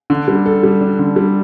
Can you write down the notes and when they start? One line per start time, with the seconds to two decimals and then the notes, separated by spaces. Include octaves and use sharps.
0.10 D3
0.28 G3
0.46 A4
0.63 G3
0.81 D4
0.99 D3
1.16 G3